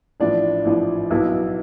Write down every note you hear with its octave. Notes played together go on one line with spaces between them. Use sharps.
A1 A2 F3 D4
A1 A2 F3
B1 B2 E4